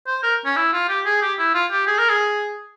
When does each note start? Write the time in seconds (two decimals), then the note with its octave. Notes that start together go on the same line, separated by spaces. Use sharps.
0.07 C5
0.23 A#4
0.45 C#4
0.57 E4
0.73 F4
0.89 G4
1.06 G#4
1.22 G4
1.39 E4
1.54 F4
1.71 G4
1.87 G#4
1.98 A#4
2.09 G#4